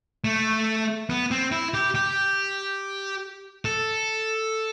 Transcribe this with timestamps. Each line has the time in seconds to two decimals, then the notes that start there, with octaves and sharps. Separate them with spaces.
0.25 A3
1.10 B3
1.31 C4
1.52 E4
1.74 G4
1.95 G4
3.65 A4